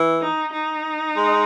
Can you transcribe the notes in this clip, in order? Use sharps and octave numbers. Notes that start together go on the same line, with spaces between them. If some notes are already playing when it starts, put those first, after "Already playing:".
Already playing: E3
D#4
D#4
G#3